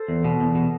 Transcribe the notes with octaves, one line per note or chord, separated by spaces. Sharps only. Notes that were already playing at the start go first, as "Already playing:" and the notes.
Already playing: A4 C5
E2
B2
E2
B2